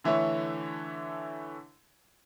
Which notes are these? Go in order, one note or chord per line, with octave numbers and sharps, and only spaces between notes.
D3 E3 A3 E4 C#5